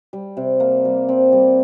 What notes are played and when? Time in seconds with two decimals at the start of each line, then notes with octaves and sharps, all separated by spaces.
0.13 G3
0.37 C3
0.60 A#3
0.85 G3
1.09 C4
1.32 G3